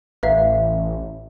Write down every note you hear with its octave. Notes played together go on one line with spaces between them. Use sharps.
A1 B4 E5 F5